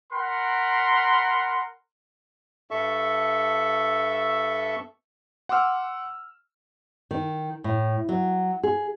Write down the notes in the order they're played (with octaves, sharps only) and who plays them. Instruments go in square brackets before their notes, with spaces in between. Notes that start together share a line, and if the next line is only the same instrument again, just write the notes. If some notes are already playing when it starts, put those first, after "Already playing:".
[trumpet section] A#4 F#5 B5 C6
[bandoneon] G2 A4 E5 C#6
[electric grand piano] F#5 C6 D6 E6 F6
[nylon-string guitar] D#3
A2
F#3
G#4